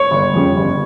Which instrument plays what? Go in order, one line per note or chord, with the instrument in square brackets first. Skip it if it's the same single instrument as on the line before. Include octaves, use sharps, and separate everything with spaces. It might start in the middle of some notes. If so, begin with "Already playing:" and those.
Already playing: [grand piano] C#5
[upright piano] G1
F2 C#3 G3 C#4
G1